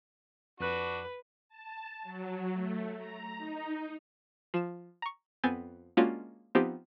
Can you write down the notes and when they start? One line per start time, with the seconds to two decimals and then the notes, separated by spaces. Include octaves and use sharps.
0.60 F2 D4 F#4 B4 F#6
1.49 A5
2.03 F#3
2.52 A3
2.97 A#5
3.38 D#4
4.54 F3 E7
5.02 A#5 C#6
5.44 F2 B3 C4 G#5 G6 A6
5.97 G#3 A#3 C#4 D4 F4 F#4
6.55 F3 B3 C4 D#4 G4